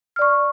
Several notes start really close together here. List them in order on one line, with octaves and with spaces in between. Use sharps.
F6 D5 C#6